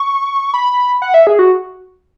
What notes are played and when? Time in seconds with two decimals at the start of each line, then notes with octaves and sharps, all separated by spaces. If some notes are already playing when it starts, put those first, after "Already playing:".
Already playing: C#6
0.54 B5
1.02 F#5
1.14 E5
1.27 G#4
1.39 F#4